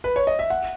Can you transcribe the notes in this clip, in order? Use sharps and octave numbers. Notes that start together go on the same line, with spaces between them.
B4
C#5
D#5
E5
F#5